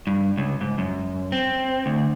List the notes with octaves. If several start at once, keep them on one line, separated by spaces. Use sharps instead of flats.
G2
C#2
G#2
F#2
C4
D2